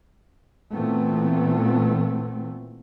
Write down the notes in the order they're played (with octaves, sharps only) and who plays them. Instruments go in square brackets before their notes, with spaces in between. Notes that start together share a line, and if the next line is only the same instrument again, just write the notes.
[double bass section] A#2 E3 A3 B3 C4